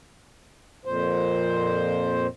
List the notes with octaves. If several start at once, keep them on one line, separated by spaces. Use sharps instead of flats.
F2 A#2 C5